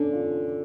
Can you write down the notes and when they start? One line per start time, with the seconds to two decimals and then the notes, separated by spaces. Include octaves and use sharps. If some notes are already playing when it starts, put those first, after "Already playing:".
Already playing: D3 C#4 D4
0.13 F4